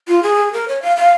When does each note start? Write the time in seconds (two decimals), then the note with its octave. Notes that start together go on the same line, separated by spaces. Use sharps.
0.08 F4
0.23 G#4
0.53 A#4
0.68 C#5
0.82 F5
0.97 F5